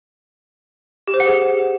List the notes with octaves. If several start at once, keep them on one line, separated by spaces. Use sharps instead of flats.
G4
C5
F#5
G#4